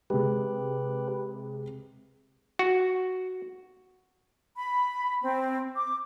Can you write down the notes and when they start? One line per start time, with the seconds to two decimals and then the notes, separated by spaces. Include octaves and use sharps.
0.10 C3 G#3 G4 B4
2.59 F#4
4.57 B5
5.23 C4
5.76 D6